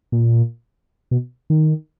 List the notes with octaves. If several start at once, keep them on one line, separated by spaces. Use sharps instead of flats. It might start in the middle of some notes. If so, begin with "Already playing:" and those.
A#2
B2
D#3